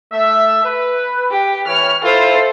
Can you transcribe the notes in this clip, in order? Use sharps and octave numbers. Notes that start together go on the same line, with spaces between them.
A3 E5
B4
G4
E3 C#5 F6
E4 F4 A4 C5